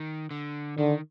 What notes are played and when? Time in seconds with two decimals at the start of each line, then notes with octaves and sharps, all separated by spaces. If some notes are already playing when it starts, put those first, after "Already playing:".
Already playing: D#3
0.31 D3
0.78 D3 D#3